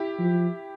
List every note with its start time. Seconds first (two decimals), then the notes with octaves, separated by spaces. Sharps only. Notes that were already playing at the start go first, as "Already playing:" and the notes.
Already playing: E4 G4
0.19 F3